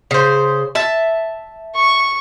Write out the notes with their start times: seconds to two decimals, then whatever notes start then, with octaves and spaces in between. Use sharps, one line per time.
0.11 C#3 C5
0.75 E5 A5
1.76 C#6